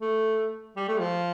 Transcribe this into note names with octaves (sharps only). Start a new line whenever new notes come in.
A3
G3
A3
F3